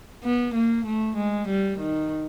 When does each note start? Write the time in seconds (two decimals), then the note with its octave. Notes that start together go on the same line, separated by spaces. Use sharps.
0.24 B3
0.55 A#3
0.86 A3
1.17 G#3
1.48 G3
1.79 D#3